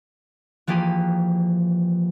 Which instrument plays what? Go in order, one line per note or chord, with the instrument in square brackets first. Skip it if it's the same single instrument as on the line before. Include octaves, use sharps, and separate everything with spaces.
[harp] E3 F3 A#3 G4 G#4